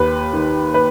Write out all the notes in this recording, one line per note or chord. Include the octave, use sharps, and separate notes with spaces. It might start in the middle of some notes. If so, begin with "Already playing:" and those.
Already playing: D#2 B4
D#3
B4